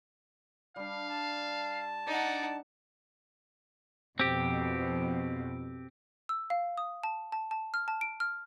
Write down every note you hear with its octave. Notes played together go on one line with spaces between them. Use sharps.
G3 D4 F5
A5
D4 D#4 D5 F#5
F2 B2 C4 G4
E6
F5
D#6
A5
A5
A5
F6
A5
D7
F6